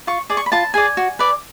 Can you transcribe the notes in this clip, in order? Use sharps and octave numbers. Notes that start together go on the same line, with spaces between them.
F4 C#6
G#4 D5
C#6
B5
F4 A5
G#4 D5 G#5
F#4
B4 D5